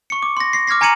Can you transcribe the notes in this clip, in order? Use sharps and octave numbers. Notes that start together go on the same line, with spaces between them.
C#6 C#7
D6
C6 A#6
A#6 C7
D6 F6 G#6 A#6 C7
G#5 A#5 G#6 C#7 D#7 F#7